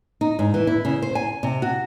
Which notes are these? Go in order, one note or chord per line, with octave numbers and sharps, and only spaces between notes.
D#4
G#2
E3
E4
C#3
C5
G#5
C3
F#4